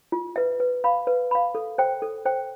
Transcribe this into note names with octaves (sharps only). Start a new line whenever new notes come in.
F4
B4 E5
B4
F5 B5
B4
F5 B5
A4
C5 G5
A4
C5 G5